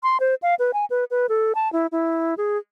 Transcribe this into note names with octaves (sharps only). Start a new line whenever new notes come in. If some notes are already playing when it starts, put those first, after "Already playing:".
C6
C5
F5
B4
G#5
B4
B4
A4
A5
E4
E4
G#4